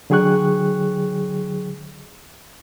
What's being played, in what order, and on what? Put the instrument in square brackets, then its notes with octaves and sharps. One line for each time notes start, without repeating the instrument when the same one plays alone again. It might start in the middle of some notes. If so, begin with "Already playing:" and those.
[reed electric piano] D3 F#3 G#4 G5 C#6 F#6